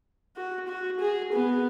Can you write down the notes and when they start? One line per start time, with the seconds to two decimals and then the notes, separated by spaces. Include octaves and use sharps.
0.36 F#4
0.68 F#4
0.99 G#4
1.32 B3